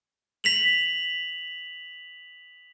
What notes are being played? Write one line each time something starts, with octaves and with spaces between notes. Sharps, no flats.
B6 F7 F#7